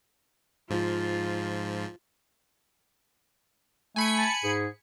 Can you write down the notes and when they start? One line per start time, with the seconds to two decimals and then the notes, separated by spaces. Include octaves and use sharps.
0.70 G#2 F3 F4
3.96 A3 G#5 B5 C#7
4.18 A5
4.44 G#2 G#4